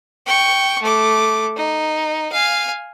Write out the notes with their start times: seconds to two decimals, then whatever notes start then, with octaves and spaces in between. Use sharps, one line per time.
0.26 G5 C#6
0.82 A3 D6
1.56 D#4
2.32 F5 G#5